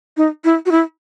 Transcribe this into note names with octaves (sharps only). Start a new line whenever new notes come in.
D#4
E4
F#4
E4